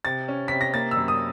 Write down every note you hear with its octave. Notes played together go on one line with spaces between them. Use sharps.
C3 A6
C#4
C3 B6
A#6
A#3 A6
E6
F#2
D#6